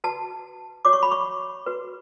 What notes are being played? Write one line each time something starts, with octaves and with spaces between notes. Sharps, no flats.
F#4 B4 A5
F#4 C#5 D6
C#6
B5
C#6
F#4 B4